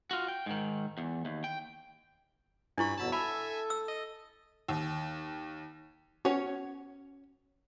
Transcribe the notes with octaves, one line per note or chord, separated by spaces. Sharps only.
F4 F#4
G5
G#2 D#3
E2
D#2
G5
G2 D4 E4 B5 C#6
F2 B2 F#3 A5 B5 E6
A4 E5 G#5 B5
E6
D#5
D#2
C#4 F#4 C#5